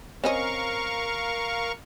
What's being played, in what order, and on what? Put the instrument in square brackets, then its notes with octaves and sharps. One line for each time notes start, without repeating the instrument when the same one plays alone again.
[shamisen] C4 C#4 D#5 [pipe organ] A#4 F5 C#6